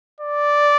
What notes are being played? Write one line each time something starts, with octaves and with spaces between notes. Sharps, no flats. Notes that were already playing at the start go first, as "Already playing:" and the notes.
D5